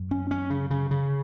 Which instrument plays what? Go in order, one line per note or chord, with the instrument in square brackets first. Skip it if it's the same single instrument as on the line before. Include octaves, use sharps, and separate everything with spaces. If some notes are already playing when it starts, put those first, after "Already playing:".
Already playing: [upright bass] F#2
[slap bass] C#4
C#4
C#3
C#3
C#3